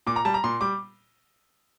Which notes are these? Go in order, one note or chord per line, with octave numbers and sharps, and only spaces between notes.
A#2 D6
A#5
G3 A5
A#5
A#2 C6
G3 D6